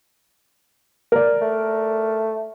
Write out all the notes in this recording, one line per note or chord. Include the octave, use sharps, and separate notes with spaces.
A#4 D5
A3